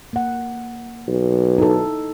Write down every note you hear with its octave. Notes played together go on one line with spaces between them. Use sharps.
A#3 F#5
B1
D#4 E4 A4